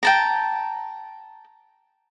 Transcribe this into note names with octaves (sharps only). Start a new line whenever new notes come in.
G5 A5 A#5